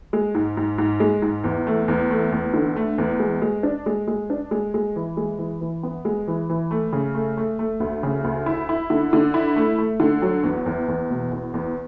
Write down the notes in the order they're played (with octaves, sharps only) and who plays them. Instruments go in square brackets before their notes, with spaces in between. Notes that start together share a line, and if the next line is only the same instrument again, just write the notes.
[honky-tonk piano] G#3
G#2
G#2
G#2
G#3
G#2
E2
A3
E2
A3
E2
D3
A3
E2
G#3
G#3
D4
G#3
G#3
D4
G#3
G#3
E3
G#3
E3
E3
B3
G#3
E3
E3
A3
C#3
A3
A3
A3
D2
C#3
D2
E4
E4
D3
D3
E4
A3
A3
D3
F#3
E2
E2
E2
B2
E2
E2